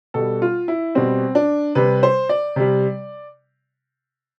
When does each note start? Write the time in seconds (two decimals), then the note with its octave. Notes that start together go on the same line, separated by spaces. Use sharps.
0.14 B2 G3 A4
0.42 F4
0.68 E4
0.95 B2 G3 C4
1.35 D4
1.75 C3 G3 B4
2.03 C5
2.29 D5
2.56 C3 G3